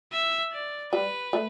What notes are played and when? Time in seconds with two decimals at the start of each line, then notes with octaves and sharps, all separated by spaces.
0.12 E5
0.52 D5
0.93 G3 B4
1.33 A3